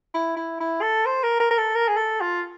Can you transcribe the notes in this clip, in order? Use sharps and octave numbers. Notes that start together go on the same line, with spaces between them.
E4
E4
E4
A4
C5
A#4
A#4
A#4
A4
A#4
G#4
A4
F4